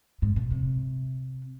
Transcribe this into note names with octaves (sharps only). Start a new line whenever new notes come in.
G#2
A#2
C3